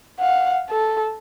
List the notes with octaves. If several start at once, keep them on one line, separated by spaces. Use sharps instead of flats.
F5 F#5
A4